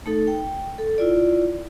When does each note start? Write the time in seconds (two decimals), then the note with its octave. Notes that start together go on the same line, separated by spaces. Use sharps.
0.06 A3 D#4 A4
0.27 G5
0.78 A4
0.98 E4 F4 D5